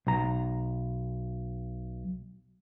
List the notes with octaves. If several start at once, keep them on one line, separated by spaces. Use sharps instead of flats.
B1 A#5